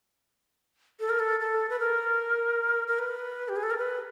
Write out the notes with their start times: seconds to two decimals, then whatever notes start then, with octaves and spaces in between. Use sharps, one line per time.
1.00 A4
1.09 A#4
1.19 A4
1.40 A4
1.70 B4
1.79 A#4
2.87 A#4
2.99 B4
3.49 G4
3.56 G#4
3.63 A4
3.70 A#4
3.78 B4